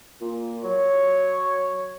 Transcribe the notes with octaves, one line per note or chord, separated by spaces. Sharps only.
A#2
F#3 C#5